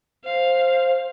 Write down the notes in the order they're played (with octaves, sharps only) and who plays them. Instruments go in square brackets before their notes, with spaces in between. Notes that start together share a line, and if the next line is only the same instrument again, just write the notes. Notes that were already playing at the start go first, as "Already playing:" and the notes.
[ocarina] C5 [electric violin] F5